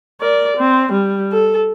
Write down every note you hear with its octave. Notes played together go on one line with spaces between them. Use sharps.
A#4 D5
C4
G3
A4